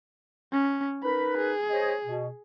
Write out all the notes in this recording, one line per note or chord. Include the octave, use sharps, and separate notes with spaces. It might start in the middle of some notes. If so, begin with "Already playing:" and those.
C#4
D#4 A#4 B4 B5
G#4
C5 C#5 D#5
B2